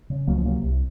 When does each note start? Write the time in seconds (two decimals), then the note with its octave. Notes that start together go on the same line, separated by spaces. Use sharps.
0.10 C#3
0.27 C#2 F#3 A#3
0.36 F3 G#3
0.45 C3 F#3 A#3
0.63 C2